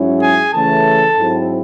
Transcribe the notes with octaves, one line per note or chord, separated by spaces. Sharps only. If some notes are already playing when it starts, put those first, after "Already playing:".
Already playing: G#2 F#3 C#4 E4
G#4 G#5
C#3 E3 A3 C#4 A4 A5
G#2 F#3 C4 E4